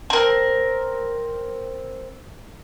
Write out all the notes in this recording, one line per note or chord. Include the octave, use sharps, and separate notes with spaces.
C4 A#4